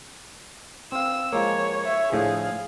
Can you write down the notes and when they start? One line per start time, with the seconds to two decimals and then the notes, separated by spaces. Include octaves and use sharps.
0.92 C4 F5 E6
1.33 F3 G#3 A#3 C#5
1.83 C#5 E5
2.12 A2 D3 F3 G#4 F5